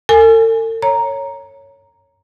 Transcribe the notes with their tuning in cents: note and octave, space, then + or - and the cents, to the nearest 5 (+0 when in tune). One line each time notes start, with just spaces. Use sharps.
A4 +45 G#5 +0
C#5 +0 A#5 +0